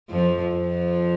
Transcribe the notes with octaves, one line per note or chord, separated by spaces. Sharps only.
F2 F3
F2 F3